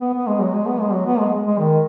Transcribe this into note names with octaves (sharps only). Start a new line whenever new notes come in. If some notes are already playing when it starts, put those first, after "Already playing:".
B3
B3
G#3
F#3
G#3
B3
G#3
F#3
B3
G#3
G#3
D#3